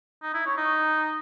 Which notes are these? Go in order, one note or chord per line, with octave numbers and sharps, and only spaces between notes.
D#4
E4
C#5
D#4